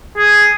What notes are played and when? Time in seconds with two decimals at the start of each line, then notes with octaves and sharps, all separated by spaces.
0.18 G#4